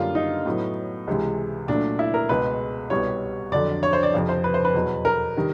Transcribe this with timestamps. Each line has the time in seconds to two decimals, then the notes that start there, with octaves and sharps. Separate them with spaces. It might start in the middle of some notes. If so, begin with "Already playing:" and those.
Already playing: F#2 D3 G3 A#3 F4
0.15 D#4
0.46 A2 F#3 B3
1.07 C#2 C3 E3 G#3
1.68 A#2 F#3 A3 D4
1.99 E4
2.14 A#4
2.29 C#2 B2 G#3 B4
2.90 C2 B2 G3 B3 C#5
3.52 F2 D3 F#3 D5
3.83 C#5
3.93 C5
4.03 D5
4.14 F2 C3 F3
4.29 C5
4.44 B4
4.54 C5
4.65 B4
4.75 E2 B2 F#3
5.05 A#4
5.36 C3 D#3 G3